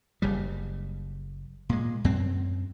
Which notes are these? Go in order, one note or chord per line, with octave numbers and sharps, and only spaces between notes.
F#1 C#3 G3
A#2 G#3
F#2 C4